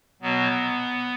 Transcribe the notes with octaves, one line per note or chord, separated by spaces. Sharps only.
B2 F#3 B3